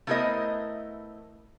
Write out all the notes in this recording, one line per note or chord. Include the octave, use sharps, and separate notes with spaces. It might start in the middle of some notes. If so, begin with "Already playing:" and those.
A3 B3 E4 A#4 C5 D#5